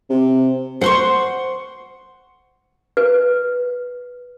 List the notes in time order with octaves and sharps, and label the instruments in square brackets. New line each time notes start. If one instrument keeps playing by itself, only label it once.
[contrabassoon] C3
[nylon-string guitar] C5 [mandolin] F#5 C6 C#6
[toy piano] B4